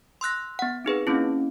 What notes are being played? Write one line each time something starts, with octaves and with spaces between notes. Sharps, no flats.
C6 E6 F#6 A#6
B3 F#5
C4 D#4 G#4 B4
A#3 C4 C#4 E4